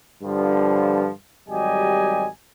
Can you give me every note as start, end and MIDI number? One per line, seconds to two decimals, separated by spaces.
0.22 1.10 43
0.22 1.10 50
0.22 1.10 53
1.48 2.28 32
1.48 2.28 54
1.48 2.28 55
1.48 2.28 67
1.48 2.28 75
1.48 2.28 80